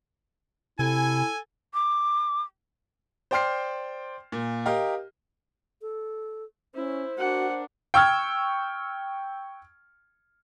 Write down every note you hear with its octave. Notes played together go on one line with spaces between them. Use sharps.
C3 E4 A4 G#5
D6
C5 D5 G5 C6 F6 C7
A#2
G4 A#4 D#5 F5
A4
C#4 E4 C5
D4 F#4 A#4 F#5
G5 C#6 E6 F6 G#6